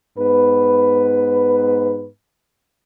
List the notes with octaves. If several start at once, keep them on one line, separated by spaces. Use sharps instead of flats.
G#2 B3 B4